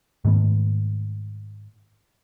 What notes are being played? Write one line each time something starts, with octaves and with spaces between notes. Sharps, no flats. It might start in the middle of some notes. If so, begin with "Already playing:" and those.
G#2 D#3 A3 B3